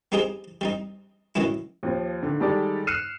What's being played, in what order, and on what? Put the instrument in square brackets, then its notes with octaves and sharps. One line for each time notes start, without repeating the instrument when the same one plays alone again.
[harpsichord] B3 C4 D#4 G4 G#4 C5
G3 C4 D#4
A2 D#3 F#3 B3 C#4 E4
[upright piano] D#2 F3
D3 D#3
D#3 G3 G#3 G4 A4 D5
F6 F#6 C7 C#7 D#7 E7